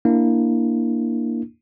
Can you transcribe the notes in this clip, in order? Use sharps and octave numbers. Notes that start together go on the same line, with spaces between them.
A#3 D4 E4